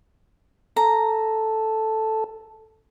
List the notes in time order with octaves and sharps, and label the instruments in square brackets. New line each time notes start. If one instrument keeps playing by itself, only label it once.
[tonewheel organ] A4 [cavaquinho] A#5